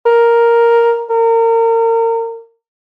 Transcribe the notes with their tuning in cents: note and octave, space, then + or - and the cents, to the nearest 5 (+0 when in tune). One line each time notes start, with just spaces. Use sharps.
A#4 +0
A#4 -30